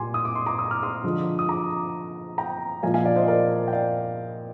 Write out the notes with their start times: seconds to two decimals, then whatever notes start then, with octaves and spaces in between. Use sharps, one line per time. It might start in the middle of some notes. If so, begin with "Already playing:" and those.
Already playing: A#2 G3 G#5 C6 D6
0.14 D#6
0.25 D6
0.35 C6
0.46 A#5 D6
0.59 D#6
0.71 F6
0.83 C6 D#6
1.04 D3 F3 G#3
1.39 D#6
1.49 A#5 D6
2.38 G5 A#5
2.83 A#2 F3 G#3 F5 G#5
2.94 F5 G#5
3.05 D5 F5
3.16 C5 D#5
3.28 A#4 D5
3.68 G5
3.73 D5 F5